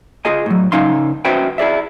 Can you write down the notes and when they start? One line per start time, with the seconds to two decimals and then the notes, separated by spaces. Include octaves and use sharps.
0.25 F4 G#4 D#5 G#5
0.46 A2 F#3
0.72 C#2 C#4 D#4 F5 C6
1.25 C#4 F#4 B4 C5 E5 G5
1.58 E4 G#4 D5 E5